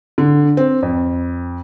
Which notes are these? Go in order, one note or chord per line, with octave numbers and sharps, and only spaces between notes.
D3
C4
F2